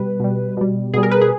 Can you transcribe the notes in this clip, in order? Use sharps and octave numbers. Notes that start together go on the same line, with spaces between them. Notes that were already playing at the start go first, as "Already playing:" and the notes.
Already playing: B2 G3 B4
B2 G3
B2 G3
B2 G3 G#4
A#4
B4
G#4